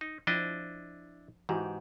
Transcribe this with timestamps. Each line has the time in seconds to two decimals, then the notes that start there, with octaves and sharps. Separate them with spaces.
0.01 D#4
0.27 F3 D4 E4 D#5
1.49 G#2 E3 F#4 G4